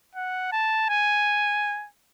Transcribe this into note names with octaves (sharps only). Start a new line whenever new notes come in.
F#5
A5
G#5